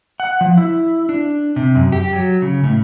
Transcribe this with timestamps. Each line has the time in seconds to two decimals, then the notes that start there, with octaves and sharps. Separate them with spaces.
0.20 F#5
0.41 F3
0.57 E4
1.09 D4
1.56 C3
1.75 F#2
1.92 G4
2.13 F#3
2.42 C#3
2.64 A2